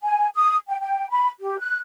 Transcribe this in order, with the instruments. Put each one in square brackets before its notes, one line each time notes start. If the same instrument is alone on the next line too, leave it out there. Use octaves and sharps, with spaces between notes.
[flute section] G#5
D#6
G5
G5
B5
G4
F#6